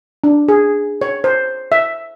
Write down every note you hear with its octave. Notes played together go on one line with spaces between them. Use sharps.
D4
G#4
C#5
C5
E5